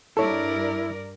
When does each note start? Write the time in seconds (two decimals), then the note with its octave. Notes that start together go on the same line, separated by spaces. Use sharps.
0.17 G2 E4 A4 A#4 C#5 D5